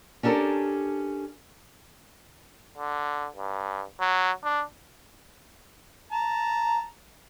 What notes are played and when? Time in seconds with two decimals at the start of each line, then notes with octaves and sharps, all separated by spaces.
0.23 C#4 D4 G4 A4 A#4
2.78 D3
3.36 G2
4.00 F#3
4.44 D4
6.12 A5 A#5